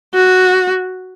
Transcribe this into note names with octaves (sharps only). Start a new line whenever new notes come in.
F#4